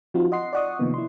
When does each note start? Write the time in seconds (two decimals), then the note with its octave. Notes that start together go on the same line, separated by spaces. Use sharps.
0.14 F3 C4 D#4 F4 F#4
0.32 D#5 F#5 C6 C7
0.53 D5 D#5 F#5 C#6 D#6
0.79 C3 D#3 F3 A#3 B3
0.94 E4 C6